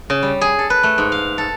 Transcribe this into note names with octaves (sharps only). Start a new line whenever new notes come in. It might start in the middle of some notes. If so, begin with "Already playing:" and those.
C#3
G3
G#4
A4
B4
A3
G#2
F5
A4